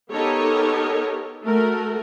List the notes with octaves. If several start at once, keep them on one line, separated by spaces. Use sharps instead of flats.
B3 D#4 G4 A4 A#4 C#5
A3 F#4 A#4